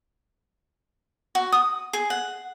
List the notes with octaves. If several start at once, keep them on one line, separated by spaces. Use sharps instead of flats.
F#4
D#6
G#4
F#5